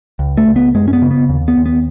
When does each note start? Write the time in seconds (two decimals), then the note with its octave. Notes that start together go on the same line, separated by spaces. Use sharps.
0.19 C#2
0.38 A3
0.47 C#2
0.56 B3
0.74 F#2 G#3
0.88 C#4
0.93 B3
1.02 C#3
1.11 B3
1.29 D#2
1.48 B3
1.57 D#2
1.66 B3